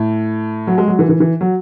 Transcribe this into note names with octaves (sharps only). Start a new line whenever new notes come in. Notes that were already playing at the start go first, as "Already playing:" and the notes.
Already playing: A2
F#3
G#3
F#3
E3
E3
E3
F#3